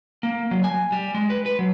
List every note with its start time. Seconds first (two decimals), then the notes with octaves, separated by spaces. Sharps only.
0.23 A#3
0.51 F#3
0.64 G#5
0.92 G3
1.14 G#3
1.30 B4
1.46 B4
1.59 F#3